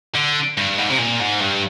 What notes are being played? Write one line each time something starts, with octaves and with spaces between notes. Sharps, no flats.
D3
G2
G#2
C3
A#2
G#2
G2